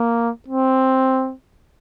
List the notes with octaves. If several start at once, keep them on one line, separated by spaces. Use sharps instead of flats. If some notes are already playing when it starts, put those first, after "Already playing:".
Already playing: A#3
C4